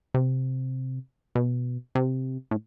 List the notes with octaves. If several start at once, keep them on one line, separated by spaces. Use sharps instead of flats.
C3
B2
C3
A2